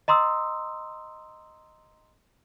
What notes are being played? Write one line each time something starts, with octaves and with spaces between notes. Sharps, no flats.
D#5 A#5 C6 D#6 E6